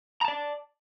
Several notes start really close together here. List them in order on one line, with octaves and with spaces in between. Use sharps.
A#5 A5 D5